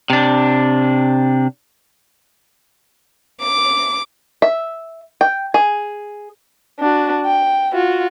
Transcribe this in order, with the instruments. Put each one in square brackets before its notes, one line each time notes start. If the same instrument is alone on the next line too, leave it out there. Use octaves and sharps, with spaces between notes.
[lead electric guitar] C3 D4
[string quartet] D6
[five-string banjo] E5
G5
G#4
[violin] D4 F#4
G5
F4 F#4